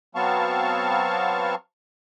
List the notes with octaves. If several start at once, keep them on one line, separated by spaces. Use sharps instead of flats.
F#3 B3 C4 F5 A5 C#6